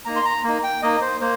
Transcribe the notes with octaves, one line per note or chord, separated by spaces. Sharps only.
A#3 D#4 A#5
C6
A#5
A#3 D#4
G5
A#3 D#4 D#5
C5
A#3 C5